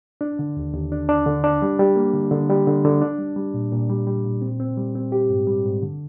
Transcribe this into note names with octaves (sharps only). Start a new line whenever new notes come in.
D4
D3
D#2
D#2
D4
D4
D3
D4
G3
G3
A#3
D3
D3
G3
D3
D3
D4
G3
G3
A#2
A#2
G3
G3
A#2
C4
C4
G3
C4
G4
G#2
G3
G#2
D3